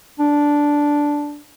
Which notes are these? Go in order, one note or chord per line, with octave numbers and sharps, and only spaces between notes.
D4